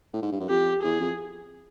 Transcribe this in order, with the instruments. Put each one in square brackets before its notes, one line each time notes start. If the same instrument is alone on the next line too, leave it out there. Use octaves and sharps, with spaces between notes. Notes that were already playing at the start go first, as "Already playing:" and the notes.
[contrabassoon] A2
G#2
G2
F#2
[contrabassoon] F2 [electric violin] G4
[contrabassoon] E2 [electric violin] G#4
[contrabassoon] F2